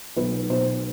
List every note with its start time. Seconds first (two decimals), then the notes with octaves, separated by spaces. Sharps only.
0.17 B1 B4
0.50 B2 C5